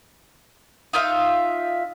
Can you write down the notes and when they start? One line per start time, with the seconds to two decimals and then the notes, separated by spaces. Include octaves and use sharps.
0.93 D#4 F4 E5 F5